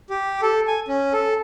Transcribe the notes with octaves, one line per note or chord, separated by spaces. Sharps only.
G4
A4
G#5
C#4
A4